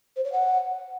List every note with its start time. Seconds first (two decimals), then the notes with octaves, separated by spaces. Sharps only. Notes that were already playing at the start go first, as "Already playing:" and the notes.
0.16 C5
0.24 C#5
0.33 F#5